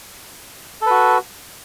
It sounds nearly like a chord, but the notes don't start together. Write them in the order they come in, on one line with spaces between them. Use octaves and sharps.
A4 B4 F#4